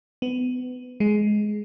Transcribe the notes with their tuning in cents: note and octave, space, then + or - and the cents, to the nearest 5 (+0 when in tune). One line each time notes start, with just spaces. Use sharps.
B3 +25
G#3 +15